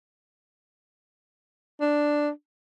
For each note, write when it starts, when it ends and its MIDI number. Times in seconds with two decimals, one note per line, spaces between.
1.80 2.29 62